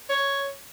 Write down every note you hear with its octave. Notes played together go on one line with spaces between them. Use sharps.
C#5